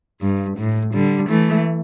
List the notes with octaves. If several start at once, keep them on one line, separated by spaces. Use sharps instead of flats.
G2
A2
D3 G3
E3 A3